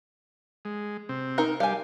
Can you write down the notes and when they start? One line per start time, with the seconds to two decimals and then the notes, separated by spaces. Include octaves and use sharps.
0.65 G#3
1.09 C3 C4
1.38 D#4 A#4
1.60 G3 G4 F5 G#5